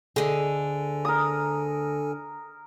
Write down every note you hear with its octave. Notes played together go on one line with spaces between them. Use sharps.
D2 D3 G#4 A4 D#5 G#5
A#4 D#6